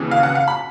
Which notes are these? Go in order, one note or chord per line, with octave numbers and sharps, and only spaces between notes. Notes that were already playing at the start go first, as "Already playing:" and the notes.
Already playing: D#2 C#3 E3
F5
F#5
F5
B5